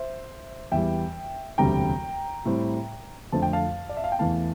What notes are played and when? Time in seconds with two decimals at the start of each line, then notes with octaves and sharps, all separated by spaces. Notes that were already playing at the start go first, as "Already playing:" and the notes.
Already playing: C5 E5
0.72 E2 E3 G3 E5 G5
1.58 E1 D2 C3 G3 G5 A#5
2.46 A2 G3 C4
3.32 F2 D3 F3 A3 C4 A5
3.42 G5
3.53 F5 A5
3.89 D5
3.97 E5
4.04 F5
4.12 G5
4.19 E2 E3 A3 F5 A5